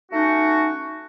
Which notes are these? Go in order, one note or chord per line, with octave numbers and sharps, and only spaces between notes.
A3 C#4 D#4 F#4